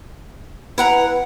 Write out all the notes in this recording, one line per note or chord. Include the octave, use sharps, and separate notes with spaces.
E4 B4 F#5 A#5